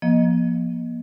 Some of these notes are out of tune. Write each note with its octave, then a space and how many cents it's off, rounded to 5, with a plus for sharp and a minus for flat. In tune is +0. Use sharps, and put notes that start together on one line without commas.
F3 +0 A#3 +40 D#5 +0